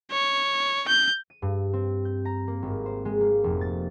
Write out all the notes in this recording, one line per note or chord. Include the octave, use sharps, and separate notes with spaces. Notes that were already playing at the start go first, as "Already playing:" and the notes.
C#5
G6
D#7
G2
C4
G6
A#5
A#3
G#1
C5
G#3
A#3
F1
A6